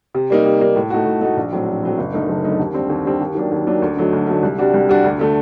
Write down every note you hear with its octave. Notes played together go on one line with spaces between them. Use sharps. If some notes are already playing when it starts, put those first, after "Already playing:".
C3
G3 A#3 D#4
C3
G3 A#3 D#4
A2
A3 D#4 F#4
A2
A3 D#4 F#4
A#1
A2 F#3 C4
A#1
A2 F#3 C4
F#1
F#2 D3 A3 D#4
F#1
F#2 D3 A3 D#4
D#2
D3 G3 C4
D#2
D3 G3 C4
D#2
D#3 F#3 A#3 D4
D#2
D#3 F#3 A#3 D4
D2
D3 F#3 A3 D#4
D2
D3 F#3 A3 D#4
C2
C3 G3 D4 F#4
C2
C3 G3 D4 F#4
D2
D3 A3